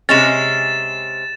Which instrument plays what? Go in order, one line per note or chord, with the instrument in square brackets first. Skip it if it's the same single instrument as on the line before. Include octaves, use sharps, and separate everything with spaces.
[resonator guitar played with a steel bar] C3 G#3 C#4 [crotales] A6 E7